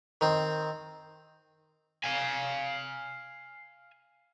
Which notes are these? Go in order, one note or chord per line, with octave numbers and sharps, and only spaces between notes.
D#3 C4
F5 G#5